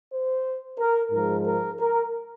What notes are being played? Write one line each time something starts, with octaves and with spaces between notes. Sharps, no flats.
C5
A#4
G#2 F3 G#3 A#4
A#4
A#4